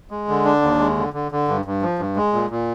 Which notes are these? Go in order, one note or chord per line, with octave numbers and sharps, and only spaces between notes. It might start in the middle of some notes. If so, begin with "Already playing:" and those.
G#3
D3
D4
D#2
G#3
D3
D3
D3
G2
G2
F3
G2
G#3
A#2
A#2